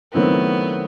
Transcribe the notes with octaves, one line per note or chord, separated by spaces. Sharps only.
D#3 F#3 A3 B3 C4 E4